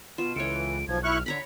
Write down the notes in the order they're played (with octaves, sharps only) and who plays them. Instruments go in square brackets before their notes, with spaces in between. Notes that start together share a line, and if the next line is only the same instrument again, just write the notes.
[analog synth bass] B2 [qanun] F4 [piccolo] E7
[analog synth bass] C#2 [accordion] E3 [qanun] A4 C#5 [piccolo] D7
[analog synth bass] B1 [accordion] F3 [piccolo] G#6
[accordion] E4 C#6 F#6 [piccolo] F6
[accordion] D3 [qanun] C#5 A#5 B5 [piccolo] B6